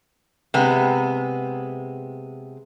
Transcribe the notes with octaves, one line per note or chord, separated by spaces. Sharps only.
C3 G#3 B3